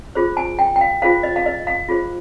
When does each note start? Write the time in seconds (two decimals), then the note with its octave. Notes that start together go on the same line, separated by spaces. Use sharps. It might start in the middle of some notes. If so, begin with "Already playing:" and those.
0.15 F4 G#4 C5
0.37 G#5
0.59 G5
0.76 G5
0.81 F5
1.02 F4 G#4 C5 F5
1.23 D#5
1.36 F5
1.46 D#5
1.67 F5
1.89 F4 G#4 C5